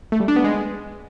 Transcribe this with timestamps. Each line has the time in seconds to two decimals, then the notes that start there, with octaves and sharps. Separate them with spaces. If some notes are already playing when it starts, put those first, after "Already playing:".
0.12 A3
0.20 G3
0.28 D4
0.36 B3
0.44 G#3